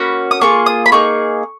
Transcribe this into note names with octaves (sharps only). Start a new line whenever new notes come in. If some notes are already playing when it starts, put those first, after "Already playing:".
Already playing: A#3 C#4 F#4 B5
D#6
A#3 F4 G#4 C#6
D#6
B5
A#3 D#4 G#4 C#6